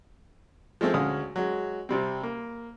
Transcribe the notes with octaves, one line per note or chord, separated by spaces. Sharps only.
F3 G#3 A3 C4
D2 G#3 C#4 F5 D#6
F#3 G#3
C3 G3 C4
A#3